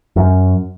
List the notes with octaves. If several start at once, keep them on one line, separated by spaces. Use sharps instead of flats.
F#2